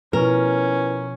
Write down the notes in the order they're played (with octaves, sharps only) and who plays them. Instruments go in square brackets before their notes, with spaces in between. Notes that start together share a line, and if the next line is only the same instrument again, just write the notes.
[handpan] B2 F3 [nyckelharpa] C#4 [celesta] E4 B4 [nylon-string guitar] A#4